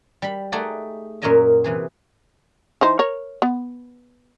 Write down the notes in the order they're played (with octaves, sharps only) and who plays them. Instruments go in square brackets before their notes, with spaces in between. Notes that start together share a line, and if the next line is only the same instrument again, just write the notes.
[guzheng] G3 B5
A3 D#4 G#4 D5 F#5 G5
F#2 A#2 A#4 C#5 D#5 E5
C3 E3 G#4
[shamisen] E3 D#4 C5
A#4 C#5
B3